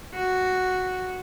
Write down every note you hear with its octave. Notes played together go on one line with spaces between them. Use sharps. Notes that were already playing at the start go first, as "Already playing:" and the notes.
F#4